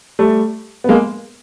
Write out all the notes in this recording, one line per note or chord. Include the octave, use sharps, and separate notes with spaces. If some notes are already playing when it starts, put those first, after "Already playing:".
G3 A3
B3
G#3 A#3